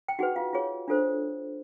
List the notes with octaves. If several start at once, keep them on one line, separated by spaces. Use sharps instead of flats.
G5
D#4 F#4 G#4 B4 F#5
F4 F5
F4 G#4 C#5
D4 F4 A4 C5